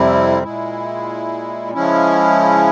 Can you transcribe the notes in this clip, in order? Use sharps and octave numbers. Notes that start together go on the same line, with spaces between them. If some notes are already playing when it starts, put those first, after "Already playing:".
Already playing: F2 C3 G3 C4 E4
A#2 G#3 E4
C#3 F3 G#3 C#4 E4